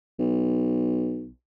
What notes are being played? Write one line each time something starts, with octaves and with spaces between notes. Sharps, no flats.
B1